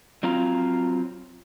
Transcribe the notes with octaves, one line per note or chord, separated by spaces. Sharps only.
F#3 C4 F4 A#5